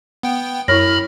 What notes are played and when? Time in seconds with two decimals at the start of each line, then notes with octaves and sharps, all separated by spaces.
0.23 B3 G5
0.68 F#2 E4 C#5 B5 F6 A#6